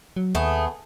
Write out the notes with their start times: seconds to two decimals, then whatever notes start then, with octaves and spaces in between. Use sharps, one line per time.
0.16 F#3
0.35 D#2 A3 B3 G#4